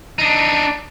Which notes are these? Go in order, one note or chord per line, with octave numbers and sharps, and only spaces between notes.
D4 D#4